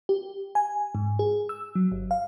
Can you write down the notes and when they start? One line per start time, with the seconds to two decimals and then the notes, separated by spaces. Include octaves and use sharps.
0.09 G4
0.55 G#5
0.95 G#2
1.19 G#4
1.49 E6
1.75 F#3
1.92 G1
2.11 F5